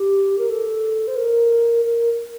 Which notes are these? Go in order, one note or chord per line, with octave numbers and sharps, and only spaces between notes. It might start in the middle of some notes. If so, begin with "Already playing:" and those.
Already playing: G4
A#4
A4
C5
A#4
A#4